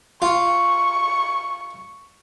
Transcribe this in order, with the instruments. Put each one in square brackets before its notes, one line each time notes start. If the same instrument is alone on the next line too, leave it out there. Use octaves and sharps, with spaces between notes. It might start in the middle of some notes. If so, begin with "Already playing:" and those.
[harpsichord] F4 [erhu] C#6